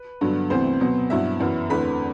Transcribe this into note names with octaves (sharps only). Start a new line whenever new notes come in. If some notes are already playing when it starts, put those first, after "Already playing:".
Already playing: B4
G2 D3 F#3 B3
D2 C3 E3 B3 C4 C5
B2 F#3 B3
G2 F#3 B3 E4 E5
F#2 E3 B3
E2 D3 A3 C4 B4 B5